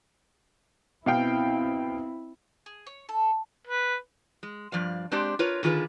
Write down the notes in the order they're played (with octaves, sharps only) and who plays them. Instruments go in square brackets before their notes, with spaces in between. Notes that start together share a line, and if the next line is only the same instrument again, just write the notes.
[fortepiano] B2 F5 G5 [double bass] C4 E4
[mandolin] G#4
C#5
A4
[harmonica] B4
[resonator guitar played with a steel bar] G#3
G2 F3 D5 F5
G#3 C4 D4 G4 D5
F4 A#4 B4 C#5
D3 D#3 F4 G#4 B4